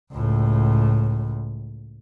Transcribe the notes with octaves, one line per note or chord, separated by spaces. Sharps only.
C#2 A2